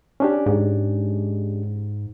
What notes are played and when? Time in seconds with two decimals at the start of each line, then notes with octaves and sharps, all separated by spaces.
0.20 C#4 D4 G4
0.46 G#2